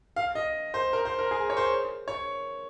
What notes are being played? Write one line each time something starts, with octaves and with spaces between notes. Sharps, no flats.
F5
D#5
C5
A#4
C5
A#4
G#4
C#5
C5
C#5